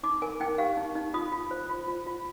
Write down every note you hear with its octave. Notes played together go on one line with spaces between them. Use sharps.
D#4 D6
A#4 G#5
D#4 G5
G4 F5
D#4
D#4
F4 D#6
F4
C5
F4
F4
F4